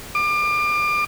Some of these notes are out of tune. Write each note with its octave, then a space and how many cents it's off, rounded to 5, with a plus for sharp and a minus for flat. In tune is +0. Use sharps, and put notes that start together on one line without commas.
D6 +30